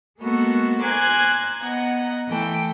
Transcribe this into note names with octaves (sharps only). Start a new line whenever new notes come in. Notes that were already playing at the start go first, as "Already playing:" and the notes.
G#3 A#3 B3 F#4 A4
C5 G#5 A#5 D6 F#6 G#6
B3 D#5 F#5 A#5
E3 A3 A4 G5